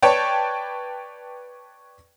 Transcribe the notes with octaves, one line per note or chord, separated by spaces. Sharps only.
B4 C#5 D5 G5 A5